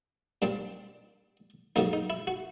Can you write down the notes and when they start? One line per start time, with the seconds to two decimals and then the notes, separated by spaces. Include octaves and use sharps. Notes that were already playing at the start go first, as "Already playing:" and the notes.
0.42 A#2 G3 C4 D4
1.76 F2 C#3 F#3 A#3 D#4
1.93 D#4
2.10 E4
2.27 F#4